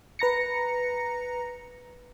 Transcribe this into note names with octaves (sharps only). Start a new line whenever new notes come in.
B4 A#5 A#6 C#7